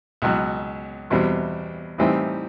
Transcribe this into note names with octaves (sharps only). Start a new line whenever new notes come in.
C#2 B2 F#3
E2 B2 G3 C4
A2 E3 G3 C4 D#4